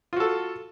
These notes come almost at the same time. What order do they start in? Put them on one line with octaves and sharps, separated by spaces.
F4 F#4 A4